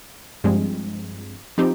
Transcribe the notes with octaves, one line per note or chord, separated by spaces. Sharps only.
G2 F3 G#3 C4
F3 C4 D#4 G4